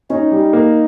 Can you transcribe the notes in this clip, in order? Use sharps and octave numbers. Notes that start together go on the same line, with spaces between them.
C#4 D#4
G3
A#3